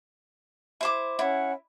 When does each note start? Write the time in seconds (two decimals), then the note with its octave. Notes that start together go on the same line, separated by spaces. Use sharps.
0.81 E4 C5 D6
1.19 C#4 E4 C#5 F#5